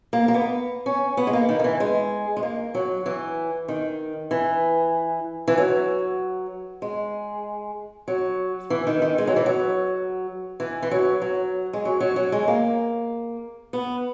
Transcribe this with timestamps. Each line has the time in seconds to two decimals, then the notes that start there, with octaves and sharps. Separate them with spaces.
0.13 A#3
0.28 A#3
0.34 B3
0.86 C#4
1.17 B3
1.27 G#3
1.33 A#3
1.49 D#3
1.59 D#3
1.64 E3
1.80 G#3
2.37 G#3
2.43 A#3
2.75 F#3
3.06 E3
3.68 D#3
4.31 E3
5.48 E3
5.58 F#3
6.82 G#3
8.08 F#3
8.70 E3
8.87 D#3
9.02 D#3
9.18 G#3
9.27 F#3
9.36 E3
9.46 F#3
10.60 E3
10.83 E3
10.91 F#3
11.22 F#3
11.73 G#3
11.85 F#3
12.00 F#3
12.16 F#3
12.32 G#3
12.48 A#3
13.73 B3